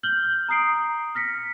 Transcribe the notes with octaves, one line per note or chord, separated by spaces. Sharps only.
F6 G6 F#7 G7
A#5 D#6 C7 D7
F6 A#6 B6 C#7